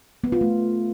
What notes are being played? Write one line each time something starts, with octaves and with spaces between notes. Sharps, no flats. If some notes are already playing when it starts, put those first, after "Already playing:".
B3
F4
A3